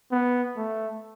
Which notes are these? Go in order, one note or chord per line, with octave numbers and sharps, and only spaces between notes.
B3
A3